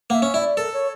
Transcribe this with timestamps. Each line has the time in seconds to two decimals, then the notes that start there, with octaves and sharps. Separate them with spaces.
0.10 A#3 F#5
0.14 E5
0.22 C#4
0.34 E4 D5
0.57 A4 A#4
0.73 C#5